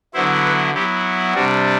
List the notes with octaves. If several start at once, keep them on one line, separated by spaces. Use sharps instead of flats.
D3 F#3 B3 E4 C5
B4
F#3 B3 E4 G4
C3 G3 D4 F#4